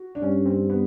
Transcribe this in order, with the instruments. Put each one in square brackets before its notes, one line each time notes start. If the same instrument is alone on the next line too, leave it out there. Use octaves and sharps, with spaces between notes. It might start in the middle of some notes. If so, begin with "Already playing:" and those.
Already playing: [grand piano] F#4
D4
[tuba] G2 [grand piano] C#4
[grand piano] C4
B3